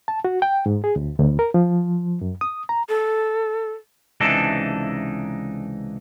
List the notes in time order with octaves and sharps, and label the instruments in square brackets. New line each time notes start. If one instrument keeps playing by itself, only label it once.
[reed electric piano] A5
F#4
G5
G#2
G#4
D2
D2
A#4
F3
F#2
D#6
A#5
[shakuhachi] A4
[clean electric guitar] C#2 C3 E3 D4 D#4 A4